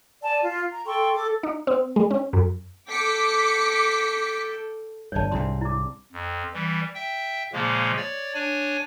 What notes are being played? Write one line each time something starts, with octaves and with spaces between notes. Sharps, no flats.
D5 G#5 A5
F4
A#5
A4 G5 C6 C#6
A4 D6
D#4
C4
G#3
C#4
F#2
A4 G5 D6 B6 C#7
G1 G2 C#5 D5 A5
C2 G#2 D4 E4 C6
E4 D6
F2
E3 G3
E5 G5
A#2 C#3 F3 G#3 A#3
C#5 D5
D4 C#5 G#5